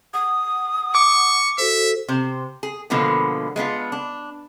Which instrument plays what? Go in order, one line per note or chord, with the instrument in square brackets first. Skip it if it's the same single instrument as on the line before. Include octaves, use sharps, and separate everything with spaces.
[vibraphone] F#5 [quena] D#6
[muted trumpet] C#6 [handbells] D6
[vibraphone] F#4 A4 C5 [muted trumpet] E5
[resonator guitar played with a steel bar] C3 C5
G#4
B2 D3 F3 G#3 A#3 B3
G#3 B3 D4 F4
D4